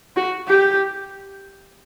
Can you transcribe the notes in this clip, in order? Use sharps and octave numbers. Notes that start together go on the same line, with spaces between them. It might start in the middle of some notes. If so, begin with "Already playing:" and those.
F#4
G4